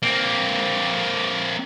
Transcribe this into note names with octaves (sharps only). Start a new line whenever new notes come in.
A#3 C4